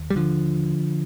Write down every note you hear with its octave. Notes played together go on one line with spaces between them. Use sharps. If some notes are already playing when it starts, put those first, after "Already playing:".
Already playing: D#2
G3
D3 F3